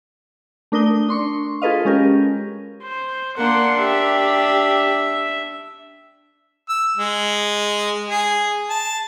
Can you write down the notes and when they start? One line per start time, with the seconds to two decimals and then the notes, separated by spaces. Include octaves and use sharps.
0.72 A3 D4 A#4 D#6 G7
1.09 D4 C6 C#6
1.62 F4 G#4 A4 B4 D#5 F5
1.85 G#3 C#4 G4 A#4
2.83 C5
3.38 A#3 D4 F#5 C6
3.79 G4 E5
6.69 E6
6.97 G#3
8.10 G#4
8.69 A5